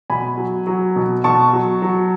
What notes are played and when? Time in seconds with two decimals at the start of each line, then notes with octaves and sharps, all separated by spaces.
0.10 B2 G#5 B5
0.37 F#3
0.67 F#3
0.96 B2
1.24 B2 A5 C#6
1.53 F#3
1.82 F#3